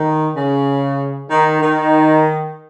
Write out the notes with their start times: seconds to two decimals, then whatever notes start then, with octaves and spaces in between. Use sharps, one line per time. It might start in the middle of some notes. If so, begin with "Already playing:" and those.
Already playing: D#3
0.35 C#3
1.30 D#3
1.62 D#3